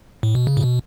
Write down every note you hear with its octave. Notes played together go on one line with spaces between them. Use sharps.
A2
B2
C#3
A2
B2